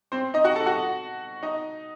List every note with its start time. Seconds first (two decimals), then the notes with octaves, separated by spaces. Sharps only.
0.12 C4 C5
0.34 D#4 D#5
0.44 F#4 F#5
0.56 A4 A5
0.66 F#4 F#5
1.43 D#4 D#5